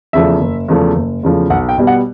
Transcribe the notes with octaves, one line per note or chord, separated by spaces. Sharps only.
E2 C#3 F3 A3 E5
F#1
E2 C#3 F3 A3
F#1
E2 C#3 F3 A3
B1 F#5
G5
B2 G3 B3
F#5